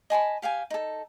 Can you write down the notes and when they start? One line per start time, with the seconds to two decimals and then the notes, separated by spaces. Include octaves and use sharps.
0.10 D#5 G#5 A5 B5
0.42 G4 F5 G5 G#5
0.70 D#4 A4